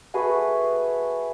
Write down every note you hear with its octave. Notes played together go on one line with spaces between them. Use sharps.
A3 F#4 G#4 B4